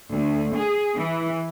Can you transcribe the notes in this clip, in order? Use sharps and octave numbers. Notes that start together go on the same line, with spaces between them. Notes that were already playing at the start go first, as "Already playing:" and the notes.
D2
G#4
E3